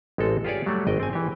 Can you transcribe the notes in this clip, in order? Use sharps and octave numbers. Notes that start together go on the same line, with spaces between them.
A1 G#3 C4 A4
F4 G4 G#4 C#5 D5
F#3 G3 A3
G#1 D#5 G5
C4 G#5
E3 G4